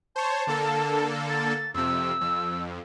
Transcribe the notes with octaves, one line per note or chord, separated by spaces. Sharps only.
C5 C#5 A5
D3 A#3 A4
A6
F2 C3 E6
F2